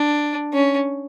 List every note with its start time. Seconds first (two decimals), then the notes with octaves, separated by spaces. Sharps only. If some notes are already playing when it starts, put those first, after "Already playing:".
Already playing: D4
0.53 C#4